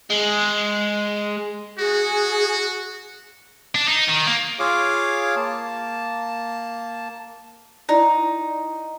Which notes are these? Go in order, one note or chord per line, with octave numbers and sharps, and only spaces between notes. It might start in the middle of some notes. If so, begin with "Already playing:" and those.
G#3
F#4 G#4
D4
D#4
D#3
A#3
F4 G#4 C#5 F5 D6
A#3 A5
D#4 E4 F#4 D5